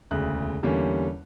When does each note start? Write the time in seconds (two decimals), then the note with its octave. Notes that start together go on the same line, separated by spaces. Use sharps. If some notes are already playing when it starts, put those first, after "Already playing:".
0.11 E1 D2 C#3 F#6
0.63 E2 D3 G3 A#3 C#4